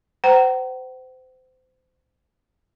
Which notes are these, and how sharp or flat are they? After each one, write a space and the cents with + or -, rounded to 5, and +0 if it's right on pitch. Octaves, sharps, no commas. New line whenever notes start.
C5 -30 F#5 +45 A#5 +0